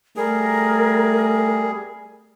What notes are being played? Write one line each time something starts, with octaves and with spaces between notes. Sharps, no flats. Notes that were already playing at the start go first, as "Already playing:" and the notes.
G3 A3 G#4 A#4